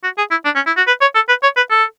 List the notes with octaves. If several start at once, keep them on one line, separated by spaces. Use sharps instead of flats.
F#4
G#4
E4
D4
C#4
E4
F#4
B4
C#5
A4
B4
C#5
B4
A4